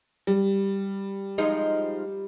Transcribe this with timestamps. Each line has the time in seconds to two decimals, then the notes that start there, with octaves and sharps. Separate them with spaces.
0.27 G3
1.38 F3 G#3 D#4